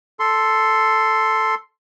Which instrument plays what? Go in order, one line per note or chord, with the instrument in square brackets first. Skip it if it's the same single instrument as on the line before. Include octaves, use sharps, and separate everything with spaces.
[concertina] A4 C6